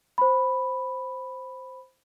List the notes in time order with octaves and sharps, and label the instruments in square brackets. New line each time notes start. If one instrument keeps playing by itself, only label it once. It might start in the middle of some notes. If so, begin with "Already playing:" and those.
[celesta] C5 B5